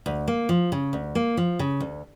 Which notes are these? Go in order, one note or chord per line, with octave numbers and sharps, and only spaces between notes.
D2
A#3
F3
C#3
D2
A#3
F3
C#3
D2